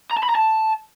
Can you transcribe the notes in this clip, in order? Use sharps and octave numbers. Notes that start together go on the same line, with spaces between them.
A#5
A5
B5
A#5
A5